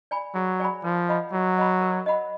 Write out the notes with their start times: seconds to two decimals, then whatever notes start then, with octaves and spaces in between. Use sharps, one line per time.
0.11 D5 G#5 B5
0.35 F#3 G#4
0.60 D5 G#5 B5
0.84 F3 A#4
1.09 D#5 F#5 B5
1.33 F#3 A#4
1.58 D#5 F#5 B5
1.82 A#4
2.06 D#5 F#5 B5